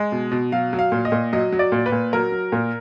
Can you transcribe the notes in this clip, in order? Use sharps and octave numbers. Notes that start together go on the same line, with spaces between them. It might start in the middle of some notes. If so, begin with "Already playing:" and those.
Already playing: G#3
B2
B2
F#3 F5
F#3
F5
A#2
D#5
A#2
F#3 D#5
F#3
D5
A#2
B4
A#2
F#3 A#4
F#3
A#2